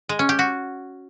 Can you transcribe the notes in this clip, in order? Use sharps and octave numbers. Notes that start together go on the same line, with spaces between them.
G#3
C#4
G4
F#4